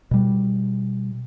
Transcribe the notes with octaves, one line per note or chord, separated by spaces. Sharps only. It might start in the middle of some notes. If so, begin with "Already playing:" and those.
B2 G3